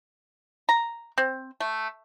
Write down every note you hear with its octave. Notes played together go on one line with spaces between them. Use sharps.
A#5
C4
A3